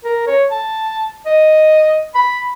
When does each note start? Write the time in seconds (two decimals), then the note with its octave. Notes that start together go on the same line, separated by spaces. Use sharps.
0.04 A#4
0.27 C#5
0.51 A5
1.26 D#5
2.15 B5